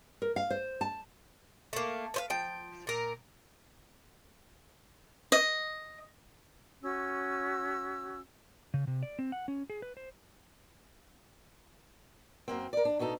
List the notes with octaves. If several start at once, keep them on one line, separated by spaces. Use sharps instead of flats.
A#4
F5
C5
A5
A3 A#3
B4 C5 F5
F3 G5
A#2 A#4
D#5
C#4 F#4 E6
C#3
C3
D5
C4
F#5
C#4
G#4
B4
C5
F#2 A#3 C4
A#4 D5
D4
D2 B2 D#4 A4